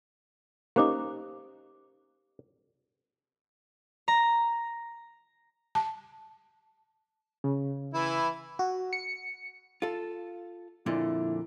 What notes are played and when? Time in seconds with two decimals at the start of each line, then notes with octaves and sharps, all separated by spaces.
0.76 A#3 C#4 D#4 G4 C5 D6
4.08 A#5
5.75 A5
7.44 C#3
7.94 E3 E4
8.59 F#4
8.93 C#7
9.82 F4 A4
10.86 F2 A#2 D3 E4